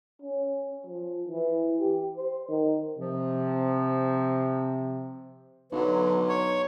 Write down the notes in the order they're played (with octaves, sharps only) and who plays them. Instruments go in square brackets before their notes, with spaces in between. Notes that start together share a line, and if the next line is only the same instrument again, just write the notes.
[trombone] C#4
F3
E3
G4
C5
D#3
[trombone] C3 [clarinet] F3
[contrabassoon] B1 [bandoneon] D3 F#3 [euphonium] B4
[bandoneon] C#5